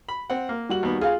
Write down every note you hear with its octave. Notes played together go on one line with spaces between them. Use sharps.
B5
C4 F#5
A#3
G3 F#4 F#7
D#2 B3
F4 G#4 F5